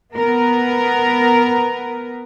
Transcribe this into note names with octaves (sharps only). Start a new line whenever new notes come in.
B3 A#4